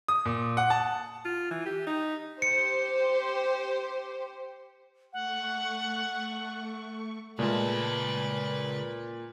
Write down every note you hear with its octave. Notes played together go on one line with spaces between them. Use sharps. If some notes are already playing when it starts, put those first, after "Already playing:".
D#6
A#2
F#5
A5
F4
E3
G4
D#4
G4 C5 C#7
A3 F#5 C#6
C#2 A#2 G#3 A3 F4 B4 A5